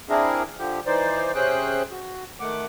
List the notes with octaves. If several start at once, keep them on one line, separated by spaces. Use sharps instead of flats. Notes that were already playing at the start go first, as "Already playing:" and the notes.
C4 D4 E4 G#4 A#4
D3 F3 G4
E3 D#4 C5 D5
C3 C#4 G#4 C5 G5 F#6
F#4
D#3 A3 F#5 D6